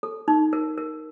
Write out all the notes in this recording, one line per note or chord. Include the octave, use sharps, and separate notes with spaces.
A4
D#4
A#4
A#4